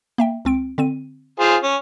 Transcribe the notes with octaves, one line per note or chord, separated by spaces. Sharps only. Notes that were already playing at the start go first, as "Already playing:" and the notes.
A#3 E5 G5
C#2 C4 D7
D3 C4 D#7
F4 G#4 C5
C#4